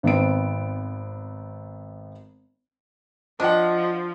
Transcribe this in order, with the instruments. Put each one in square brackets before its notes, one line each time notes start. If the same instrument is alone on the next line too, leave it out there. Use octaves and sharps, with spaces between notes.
[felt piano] G#1 B3 C4 D7
[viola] F3 [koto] D4 [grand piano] D#5 F#5